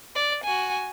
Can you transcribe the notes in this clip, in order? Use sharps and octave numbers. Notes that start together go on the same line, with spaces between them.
D5
F#4 G#5